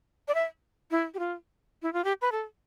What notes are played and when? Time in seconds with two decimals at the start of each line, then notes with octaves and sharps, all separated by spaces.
0.28 D5
0.34 E5
0.91 E4
1.14 G4
1.19 F4
1.82 E4
1.93 F4
2.04 G4
2.22 B4
2.32 A4